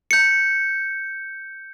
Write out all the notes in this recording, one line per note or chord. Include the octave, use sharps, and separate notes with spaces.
G6 C#7